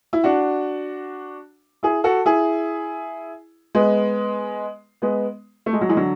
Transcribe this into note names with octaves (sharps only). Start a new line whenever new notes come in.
E4
D4 F#4
E4 G#4
F#4 A4
E4 G#4
G#3 B3
G#3 B3
A3
G#3
F#3
E3 G#3
D3 F#3